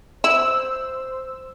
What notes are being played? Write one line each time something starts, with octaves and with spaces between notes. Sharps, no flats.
E4 C5 E6